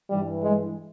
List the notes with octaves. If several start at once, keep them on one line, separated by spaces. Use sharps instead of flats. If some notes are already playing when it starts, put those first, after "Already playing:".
G2 E3 G3
G#3